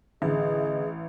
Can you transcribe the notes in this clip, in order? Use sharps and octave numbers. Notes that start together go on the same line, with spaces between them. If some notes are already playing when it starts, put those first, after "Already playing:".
A1 D3 G#4 D#5 E5